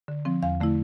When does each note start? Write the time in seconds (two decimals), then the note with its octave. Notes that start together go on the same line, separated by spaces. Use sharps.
0.08 D3
0.25 F3 C4
0.43 E2 F5
0.61 D3 A3 E4